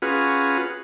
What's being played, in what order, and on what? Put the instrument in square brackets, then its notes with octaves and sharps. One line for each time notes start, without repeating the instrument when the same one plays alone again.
[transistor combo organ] C#4 F4 F#4 G#4 B4